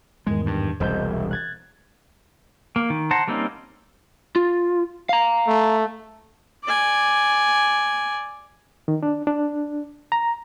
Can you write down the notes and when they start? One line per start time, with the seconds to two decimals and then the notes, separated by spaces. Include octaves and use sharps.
0.27 E2 G#2 D#3 G#3
0.46 G2
0.80 E1 C2 C5 D#5 G6
1.14 E5
1.31 F#6 G#6 A6
2.76 A#3
2.90 D#3
3.11 C5 F#5 A5 A#5
3.27 G3 A#3 C4 C#4 D#4
4.36 F4
5.09 F5 A#5
5.47 A3
6.64 D5 G#5
8.88 D#3
9.03 D4
9.27 D4
10.12 A#5